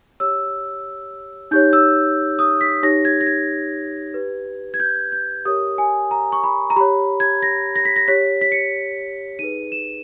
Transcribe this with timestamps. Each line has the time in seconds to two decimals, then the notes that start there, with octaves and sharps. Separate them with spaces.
0.20 G4 C#5 E6
1.51 D#4 G4 C#5 G6
1.73 E6
2.39 D#6
2.61 B6
2.83 D#4 G4 C#5 A#6
3.05 G#6
3.21 A#6
3.27 G#6
4.14 G4 B4
4.74 G#6
4.80 G6
5.12 G6
5.45 G4 A#4 C#5 D#6
5.78 G#5
6.11 A#5
6.32 C#6
6.44 B5
6.70 A#5
6.76 G4 C#5 B5
7.20 G#6
7.42 A#6
7.76 A#6
7.85 B6
7.96 A#6
8.08 G4 C#5 B6
8.41 B6
8.52 C#7
9.39 D#4 G#4 B4 D#7
9.72 E7